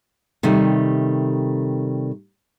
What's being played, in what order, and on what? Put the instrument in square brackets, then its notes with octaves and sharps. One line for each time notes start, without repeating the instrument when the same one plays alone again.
[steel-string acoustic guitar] C3 D#3 G3 A3